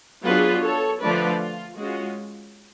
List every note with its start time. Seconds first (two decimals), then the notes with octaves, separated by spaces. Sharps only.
0.24 F#3 B3 D4 F4 G#4 B4
0.62 A4 C#5
1.00 D3 F3 A3 F4 B4 D5
1.39 F4
1.76 G#3 C#4 F4 F#4